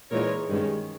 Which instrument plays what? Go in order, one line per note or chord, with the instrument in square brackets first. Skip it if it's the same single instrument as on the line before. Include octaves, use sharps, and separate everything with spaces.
[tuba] A#2 [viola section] E3 G#3 D#4 A#4 C#5
[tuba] G2 [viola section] D#3 G#3 C#4